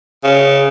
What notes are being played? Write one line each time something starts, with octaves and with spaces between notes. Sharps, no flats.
C#3